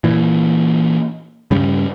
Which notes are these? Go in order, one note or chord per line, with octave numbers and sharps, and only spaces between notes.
A#2 E3
G2 C#3 G3